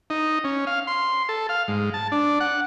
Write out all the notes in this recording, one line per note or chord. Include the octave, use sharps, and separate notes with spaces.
D#4
C#4
F5
C6
A4
F5
G#2
A5
D4
F#5